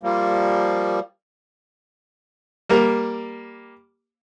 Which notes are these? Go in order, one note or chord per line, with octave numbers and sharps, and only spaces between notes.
F3 G3 A#3
G3 A#3 A#4